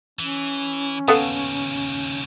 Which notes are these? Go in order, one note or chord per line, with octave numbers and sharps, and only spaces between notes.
E3 C#4
D#2 C#3 B3 A4 F5